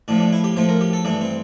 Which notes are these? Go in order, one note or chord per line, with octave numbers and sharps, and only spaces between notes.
A2 F3 A3 D4
D4
E4
G4
A2 F3 A3 C5
A#4
G4
A4
G2 E3 A3 D4
C4